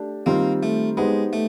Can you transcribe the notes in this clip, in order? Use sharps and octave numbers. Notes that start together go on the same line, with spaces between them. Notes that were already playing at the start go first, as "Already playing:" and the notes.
Already playing: A3 D4 G4
D#3 G3 A#3 C4 F4
A3
G#3 B3 D#4 G4 C5
A3